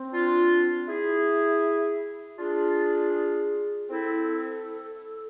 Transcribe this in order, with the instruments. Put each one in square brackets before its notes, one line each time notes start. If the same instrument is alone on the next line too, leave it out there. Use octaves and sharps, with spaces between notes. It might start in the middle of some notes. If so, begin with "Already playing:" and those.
Already playing: [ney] C4
[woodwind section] D4 F4
E4 G#4
[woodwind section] D4 F4 [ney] G#4
[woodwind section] C4 E4 [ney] A4